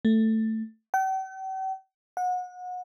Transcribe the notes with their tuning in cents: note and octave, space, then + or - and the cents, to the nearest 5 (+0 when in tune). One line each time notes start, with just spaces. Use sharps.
A3 +10
G5 -45
F#5 -30